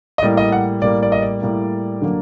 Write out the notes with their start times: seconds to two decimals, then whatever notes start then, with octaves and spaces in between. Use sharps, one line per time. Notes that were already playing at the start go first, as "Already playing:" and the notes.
0.18 D#5
0.22 A2 G3 A#3 D5
0.37 D#5
0.52 F#5
0.82 A2 G3 A#3 D5
1.03 D5
1.12 D#5
1.22 D5
1.42 A2 G3 A#3
2.02 D3 F#3 A#3